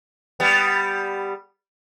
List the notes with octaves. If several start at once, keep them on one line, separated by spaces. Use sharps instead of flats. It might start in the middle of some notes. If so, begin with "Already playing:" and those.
G3 B3